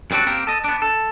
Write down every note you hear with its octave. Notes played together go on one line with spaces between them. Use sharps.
F#2 G3 C4 D4 F#4
A#3 C4 G4 A#4
A4 D#5
B3 D4
A4